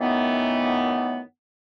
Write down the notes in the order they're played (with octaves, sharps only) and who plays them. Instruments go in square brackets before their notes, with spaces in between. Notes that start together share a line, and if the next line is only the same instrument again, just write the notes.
[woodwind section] F#2 D#3 E3 A3 B3